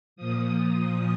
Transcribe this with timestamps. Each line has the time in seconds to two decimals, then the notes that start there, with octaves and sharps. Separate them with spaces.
0.16 A#2 F3 D#6